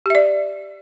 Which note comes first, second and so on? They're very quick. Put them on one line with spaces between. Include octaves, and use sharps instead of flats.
G4 E5 D5